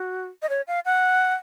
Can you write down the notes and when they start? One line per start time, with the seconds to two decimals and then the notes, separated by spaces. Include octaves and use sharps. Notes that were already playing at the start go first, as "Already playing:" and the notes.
Already playing: F#4
0.42 D#5
0.49 C#5
0.68 F5
0.85 F#5